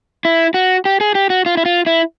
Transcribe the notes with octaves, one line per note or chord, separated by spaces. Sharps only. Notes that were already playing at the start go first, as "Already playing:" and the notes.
E4
F#4
G4
G#4
G4
F#4
F4
E4
F4
E4